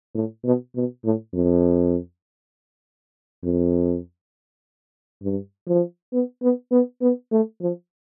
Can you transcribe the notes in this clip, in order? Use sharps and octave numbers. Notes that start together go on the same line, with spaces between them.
A2
B2
B2
A2
F2
F2
G2
F3
B3
B3
B3
B3
A3
F3